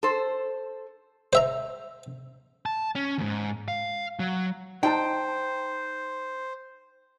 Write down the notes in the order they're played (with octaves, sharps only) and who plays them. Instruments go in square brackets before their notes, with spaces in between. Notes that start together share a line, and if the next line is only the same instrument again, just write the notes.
[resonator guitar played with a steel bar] A4 C5
[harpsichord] C5 E5 A#5
[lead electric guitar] A5
C#4
D#2 G#2
F5
F#3
[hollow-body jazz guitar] D#4 A5 [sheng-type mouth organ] C5 [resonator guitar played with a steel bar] G5